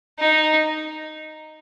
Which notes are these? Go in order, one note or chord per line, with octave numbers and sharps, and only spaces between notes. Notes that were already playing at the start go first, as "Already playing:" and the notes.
D#4